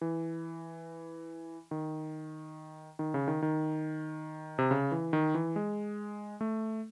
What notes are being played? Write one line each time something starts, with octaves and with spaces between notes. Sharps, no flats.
E3
D#3
D#3
C#3
D#3
D#3
C3
C#3
E3
D#3
E3
G#3
A3